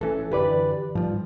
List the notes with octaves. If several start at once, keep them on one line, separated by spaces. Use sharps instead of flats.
A1 E3 C#4 A4
F#2 D3 E3 G4 B4 D5
G#2 F3 G3